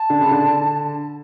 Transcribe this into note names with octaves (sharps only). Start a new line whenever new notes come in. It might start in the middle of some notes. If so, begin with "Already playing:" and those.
Already playing: A5
D3
C#3
D3